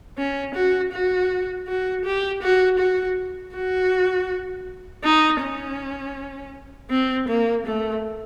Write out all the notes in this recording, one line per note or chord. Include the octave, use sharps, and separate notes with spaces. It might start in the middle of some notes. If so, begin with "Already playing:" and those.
C#4
F#4
F#4
F#4
G4
F#4
F#4
F#4
D#4
C#4
C4
A#3
A3